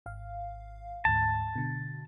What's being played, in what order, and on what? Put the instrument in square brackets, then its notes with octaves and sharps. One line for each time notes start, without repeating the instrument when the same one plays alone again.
[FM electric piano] G#1 F5
[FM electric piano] D2 G#2 [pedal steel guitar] A5
[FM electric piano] B2 D3